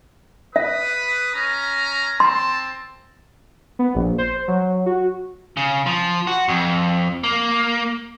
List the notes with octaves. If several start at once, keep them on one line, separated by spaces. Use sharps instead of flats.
B4 E5 D#6
C#4 A#5
C4 A5 C6
B3
A#1
C5
F#3
F#4
C#3
F3
F#4
F2
A#3